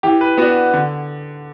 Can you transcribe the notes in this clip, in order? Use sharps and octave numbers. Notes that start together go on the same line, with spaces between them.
E3 G4
B4
B3 D4 F#4
D3